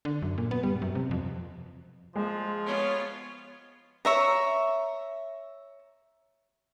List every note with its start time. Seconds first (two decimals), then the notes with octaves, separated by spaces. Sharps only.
0.05 D3
0.22 F#2
0.38 A#2
0.51 B3
0.63 G3
0.82 F#2
0.95 C3
1.11 F2
2.16 F3 G#3
2.66 B3 F4 C#5
4.05 C#5 E5 A#5